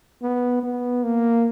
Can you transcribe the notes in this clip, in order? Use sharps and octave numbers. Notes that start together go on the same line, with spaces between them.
B3
B3
A#3